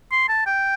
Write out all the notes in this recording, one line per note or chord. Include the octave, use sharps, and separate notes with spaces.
C6
A5
G5